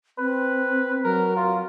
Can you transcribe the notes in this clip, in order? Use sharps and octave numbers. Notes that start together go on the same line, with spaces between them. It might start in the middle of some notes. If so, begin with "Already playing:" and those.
C4 B4
F#3 A#4
F4